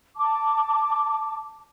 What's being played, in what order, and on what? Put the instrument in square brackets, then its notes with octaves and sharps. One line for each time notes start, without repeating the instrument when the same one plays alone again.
[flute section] A5 D6